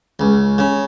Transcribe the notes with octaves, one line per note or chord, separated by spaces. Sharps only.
C#2
C#3